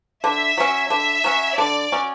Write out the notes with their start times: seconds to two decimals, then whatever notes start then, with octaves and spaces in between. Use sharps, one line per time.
0.24 D3 E5
0.57 F#3 C#4
0.90 D3 E5
1.24 F#3 C#4
1.58 D3 D5
1.92 F#3 C#4